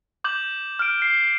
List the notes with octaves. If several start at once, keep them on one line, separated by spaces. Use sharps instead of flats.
D6 G6 F#7
F6 D7
C7